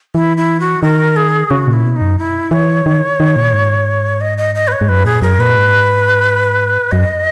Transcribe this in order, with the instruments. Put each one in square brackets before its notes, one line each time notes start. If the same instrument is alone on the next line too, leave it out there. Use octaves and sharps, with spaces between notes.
[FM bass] E3 [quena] E4
[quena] E4
F#4
[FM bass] D#3 [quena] A#4
[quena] G#4
[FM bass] C#3 [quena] F#4
[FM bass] A#2
[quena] E4
[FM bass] B2
[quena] D#4
[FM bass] F#2
[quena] E4
[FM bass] E3 [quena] C#5
[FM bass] D#3
D#3
A#2
G#2
[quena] D#5
D#5
D#5
B4
C#5
[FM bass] G#2
[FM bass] F#2 [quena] B4
[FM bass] A#2 [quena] G#4
[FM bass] F#2 [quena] A#4
[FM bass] A#2 [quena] B4
[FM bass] G#2
[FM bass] F#2 [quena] D#5